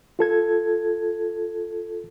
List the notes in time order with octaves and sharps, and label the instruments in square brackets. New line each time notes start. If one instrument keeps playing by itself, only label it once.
[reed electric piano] F4 A4 G#6